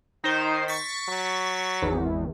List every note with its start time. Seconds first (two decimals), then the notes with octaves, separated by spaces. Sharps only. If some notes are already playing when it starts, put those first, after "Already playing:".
0.24 D#3 D#4 C5
0.68 C#6 A6 B6
1.08 F#3
1.82 G#1 E2